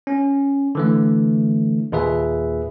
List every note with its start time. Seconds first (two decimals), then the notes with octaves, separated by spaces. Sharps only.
0.07 C#4
0.75 D3 E3 A3
1.92 D#2 A#2 G#4 B4 E5